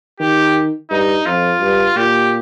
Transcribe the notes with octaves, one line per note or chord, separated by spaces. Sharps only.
D#3 G4
G2 D#4
F2 F4
G2
A#2 G4